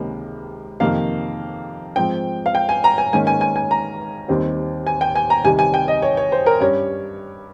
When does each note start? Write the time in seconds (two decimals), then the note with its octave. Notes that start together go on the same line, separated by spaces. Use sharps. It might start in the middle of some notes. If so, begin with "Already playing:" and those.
Already playing: C#2 C3 D#3 A#3 C#4
0.80 F2 C3 D#3 A#3 F5
1.96 G#2 F3 C4 G5
2.46 F5
2.55 G5
2.69 G#5
2.84 A#5
2.98 G#5
3.13 G#2 D#3 A#3 C#4 G#5
3.27 G#5
3.41 G#5
3.56 G#5
3.71 A#5
4.28 D#2 D#3 G3 C4
4.87 G#5
5.01 G5
5.15 G#5
5.30 A#5
5.45 C2 C3 D#3 G3 G#5
5.59 G#5
5.74 G5
5.88 D#5
6.02 C#5
6.17 C#5
6.32 C5
6.46 A#4
6.60 G2 G3 C#4 C#5